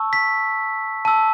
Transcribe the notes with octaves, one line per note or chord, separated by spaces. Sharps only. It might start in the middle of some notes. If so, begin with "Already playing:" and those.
Already playing: A5 C#6 E6
B6
A5 E6